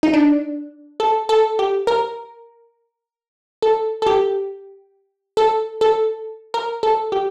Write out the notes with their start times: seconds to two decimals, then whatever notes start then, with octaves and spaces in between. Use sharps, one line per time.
0.03 D#4
0.14 D4
1.00 A4
1.29 A4
1.59 G4
1.87 A#4
3.62 A4
4.02 A4
4.06 G4
5.37 A4
5.81 A4
6.54 A#4
6.83 A4
7.12 G4